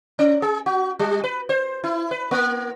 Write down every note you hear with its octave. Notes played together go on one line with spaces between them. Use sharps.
C#4
G#4
F#4
G3
B4
C5
E4
B4
A#3